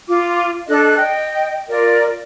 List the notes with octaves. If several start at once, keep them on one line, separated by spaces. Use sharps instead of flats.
F4 D6
D4 A4 D#5 F#6
D#5 G5
F4 A#4 D5